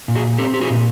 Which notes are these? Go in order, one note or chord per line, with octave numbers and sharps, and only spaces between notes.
A#2
F#4 G#4
C4 G4 A4
G4
F#4 G#4
A#2